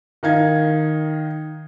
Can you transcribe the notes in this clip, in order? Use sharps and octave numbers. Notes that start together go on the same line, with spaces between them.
D#3 D#4 F5 G#6